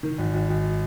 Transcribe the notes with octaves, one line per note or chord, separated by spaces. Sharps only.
D#3
G#1
G#1
G#1